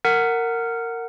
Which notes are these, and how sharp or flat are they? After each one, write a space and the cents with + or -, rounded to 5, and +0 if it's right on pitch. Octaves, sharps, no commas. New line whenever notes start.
A#4 -15 F#5 +0